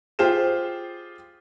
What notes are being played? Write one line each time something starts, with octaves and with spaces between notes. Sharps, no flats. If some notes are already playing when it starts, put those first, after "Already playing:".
F4 G4 G#4 C5 F6 E7